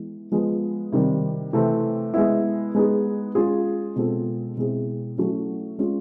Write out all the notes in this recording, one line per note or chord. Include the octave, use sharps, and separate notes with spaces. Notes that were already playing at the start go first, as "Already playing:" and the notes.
Already playing: E3 G#3 B3
F3 G#3 B3
C3 D#3 G3
C3 E3 A3 C4
G#3 B3 E4
G#3 B3 D#4 G#4
G#3 C#4 F4 G#4
B2 G#3 C4 F4 A4
B2 G#3 C4 E4 G#4
F#3 A3 C#4 E4
G#3 C#4 F4